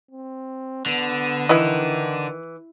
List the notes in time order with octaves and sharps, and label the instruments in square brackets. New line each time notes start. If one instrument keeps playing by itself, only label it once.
[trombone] C4
[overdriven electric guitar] D3 [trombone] B3
[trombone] D#3 [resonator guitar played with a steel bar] E3 [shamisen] E4 B4 D#5